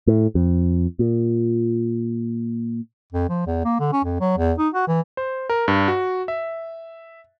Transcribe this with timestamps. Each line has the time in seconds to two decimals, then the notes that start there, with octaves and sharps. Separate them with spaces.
0.07 A2
0.35 F2
0.99 A#2
3.13 F2
3.29 F3
3.47 E2
3.65 A#3
3.80 D3
3.93 C#4
4.04 F2
4.20 F#3
4.38 E2
4.58 D#4
4.74 F#4
4.88 E3
5.17 C5
5.50 A#4
5.68 G2
5.88 F#4
6.28 E5